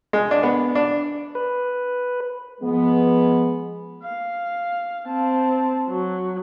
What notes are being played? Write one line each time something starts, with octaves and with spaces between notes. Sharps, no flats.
G#3
D4
B3
D4
B4
F3 G#3 B3
F5
C4 A5
F#3